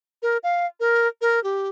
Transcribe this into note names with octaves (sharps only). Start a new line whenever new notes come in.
A#4
F5
A#4
A#4
G4